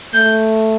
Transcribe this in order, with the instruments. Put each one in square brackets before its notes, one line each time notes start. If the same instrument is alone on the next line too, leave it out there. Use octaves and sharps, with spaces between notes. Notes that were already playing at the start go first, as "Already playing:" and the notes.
[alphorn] A3 [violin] G6